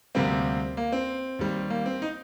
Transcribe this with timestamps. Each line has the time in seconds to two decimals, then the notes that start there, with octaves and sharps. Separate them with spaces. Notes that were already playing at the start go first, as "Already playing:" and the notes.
0.15 D2 C3 G3 A#3 C4
0.77 A#3
0.92 C4
1.39 D#2 D#3 G3
1.70 A#3
1.86 C4
2.02 D#4